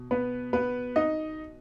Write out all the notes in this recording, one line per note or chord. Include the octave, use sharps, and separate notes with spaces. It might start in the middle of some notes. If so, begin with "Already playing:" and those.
Already playing: B2
B3 B4
B3 B4
D#4 D#5